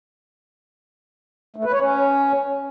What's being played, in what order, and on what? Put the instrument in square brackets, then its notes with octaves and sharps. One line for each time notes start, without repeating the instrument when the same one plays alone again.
[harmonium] A3
B4
C#5
C#4